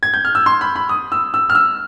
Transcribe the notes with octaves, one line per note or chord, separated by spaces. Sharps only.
G#6
G6
F6
E6
C6
B5
B5
D#6
E6
E6
F6
E6